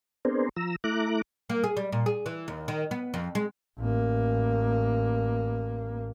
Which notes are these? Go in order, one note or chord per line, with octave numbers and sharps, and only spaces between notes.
B3 C4 D4 G#4 A#4 C5
F3 A#5 E6
A3 E4 A#5 D6 F#6
A#3
G#4
G3
A#2
G#4
E3
D#2
D#3
B3
F2
G#3
A1 A#3